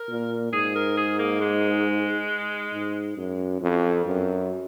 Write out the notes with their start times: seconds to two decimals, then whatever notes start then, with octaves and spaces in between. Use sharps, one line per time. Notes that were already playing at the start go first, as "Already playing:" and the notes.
Already playing: A#4
0.09 A#2
0.53 G#2 G#4
0.75 A#4
0.97 G#4
1.19 A#3
1.41 G#3
2.74 G#2
3.17 F#2
3.62 F2
4.06 F#2